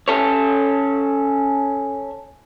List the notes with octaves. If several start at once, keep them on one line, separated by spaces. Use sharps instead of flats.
C#4 A4 C#5